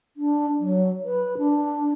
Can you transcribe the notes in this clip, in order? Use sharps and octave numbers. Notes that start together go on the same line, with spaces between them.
D4
F#3
B4
D4